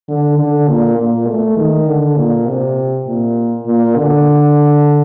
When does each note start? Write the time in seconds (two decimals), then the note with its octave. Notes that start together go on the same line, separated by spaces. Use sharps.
0.08 D3
0.38 D3
0.68 A#2
0.98 A#2
1.27 A3
1.58 D#3
1.87 D3
2.17 A#2
2.47 C3
3.07 A#2
3.66 A#2
3.96 D3